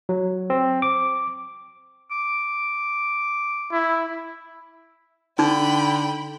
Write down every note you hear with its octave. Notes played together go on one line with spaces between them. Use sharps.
F#3
C4
D6
D6
E4
D3 D#4 G5 B5